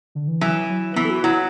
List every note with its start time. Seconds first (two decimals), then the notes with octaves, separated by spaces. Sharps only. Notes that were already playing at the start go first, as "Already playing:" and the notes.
0.15 D3
0.28 E3
0.41 E3 F#3
0.69 F#3
0.96 E3 B3
1.05 A4
1.10 F#4
1.23 F#3 E4